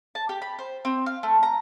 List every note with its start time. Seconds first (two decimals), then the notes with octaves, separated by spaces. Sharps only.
0.15 A5
0.29 G4
0.42 B5
0.59 C5
0.85 C4
1.06 F5
1.23 A3
1.43 A#5